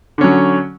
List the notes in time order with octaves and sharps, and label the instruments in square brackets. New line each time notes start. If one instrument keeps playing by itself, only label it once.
[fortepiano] D3
C#4
F#3